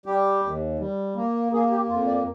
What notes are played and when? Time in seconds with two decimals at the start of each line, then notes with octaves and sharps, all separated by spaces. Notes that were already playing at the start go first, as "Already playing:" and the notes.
0.06 G3 G4
0.42 D#2
0.79 G3
1.16 A#3
1.52 A#3 G#4
1.71 G4
1.89 F2 F4
2.07 D5